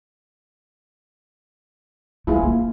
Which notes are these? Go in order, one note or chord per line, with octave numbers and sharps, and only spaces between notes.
A3 D4 E4 F4 G#4
A#3